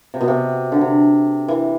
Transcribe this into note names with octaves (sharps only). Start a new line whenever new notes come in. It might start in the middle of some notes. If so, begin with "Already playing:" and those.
C3
B2
C3
D3
C3
E3